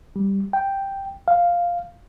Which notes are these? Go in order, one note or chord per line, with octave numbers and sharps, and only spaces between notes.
G3
G5
F5